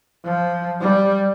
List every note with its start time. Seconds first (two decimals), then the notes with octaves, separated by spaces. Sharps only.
0.24 F3
0.80 G3